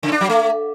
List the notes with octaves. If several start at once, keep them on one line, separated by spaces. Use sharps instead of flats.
C#3
D4
F#3
A3